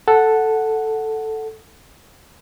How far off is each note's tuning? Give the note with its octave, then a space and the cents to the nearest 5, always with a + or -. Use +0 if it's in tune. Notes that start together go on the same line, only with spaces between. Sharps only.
A4 +0 F#5 +0